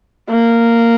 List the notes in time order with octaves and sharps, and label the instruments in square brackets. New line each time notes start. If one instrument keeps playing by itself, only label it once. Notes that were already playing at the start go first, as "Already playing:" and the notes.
[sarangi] A#3